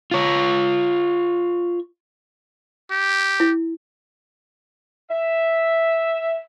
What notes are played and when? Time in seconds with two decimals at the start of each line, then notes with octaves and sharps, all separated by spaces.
0.11 F4 C#5
2.91 G4
3.40 E4
5.10 E5